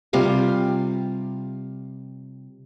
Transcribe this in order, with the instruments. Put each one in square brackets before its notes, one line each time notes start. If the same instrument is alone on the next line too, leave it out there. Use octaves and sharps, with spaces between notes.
[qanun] C3 G3 F4 G#5